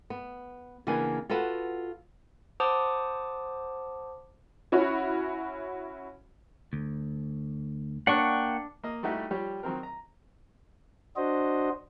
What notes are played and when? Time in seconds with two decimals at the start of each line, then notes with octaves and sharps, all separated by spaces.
0.10 B3
0.87 C#3 E3 A#3 B3 D4 G#5
1.30 F4 F#4 A4 B4 F#5
2.60 C5 F#5 A5 D6 D#6
4.72 C#4 E4 F#4 C#5
6.73 D2
8.07 A#3 D4 F#5 G5 C#6
8.83 A#3 D#5
9.03 G3 A3 D#4 E4 F#4 G4
9.30 F3 G3 G4 C#5
9.63 D#3 F#3 C4 A#4
9.83 A#5
11.16 D4 F#4 C5 D#5